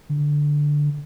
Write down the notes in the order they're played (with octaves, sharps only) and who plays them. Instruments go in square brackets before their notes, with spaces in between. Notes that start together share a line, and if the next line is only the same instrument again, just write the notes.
[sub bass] D3